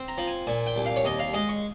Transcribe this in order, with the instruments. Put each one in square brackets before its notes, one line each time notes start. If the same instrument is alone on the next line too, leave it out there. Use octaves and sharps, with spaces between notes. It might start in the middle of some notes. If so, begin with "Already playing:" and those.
Already playing: [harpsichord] C4
A#5
F3
G#5
A#2 G#5
G5
C2
F5
C#5
D#2 D#5
F5
G#3 D#5
C#6